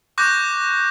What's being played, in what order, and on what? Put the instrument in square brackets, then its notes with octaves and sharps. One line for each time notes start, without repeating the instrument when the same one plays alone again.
[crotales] C#6 D6 F#6 G6 A#6